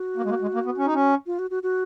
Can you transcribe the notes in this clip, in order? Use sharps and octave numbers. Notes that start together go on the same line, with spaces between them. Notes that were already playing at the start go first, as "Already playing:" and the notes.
Already playing: F#4
A#3
G#3
A#3
G#3
A#3
B3
C#4
D#4
C#4
F4
F#4
F#4
F#4